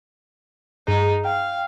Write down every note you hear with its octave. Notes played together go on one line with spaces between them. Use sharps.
G2 D#4 G#4
F5 G5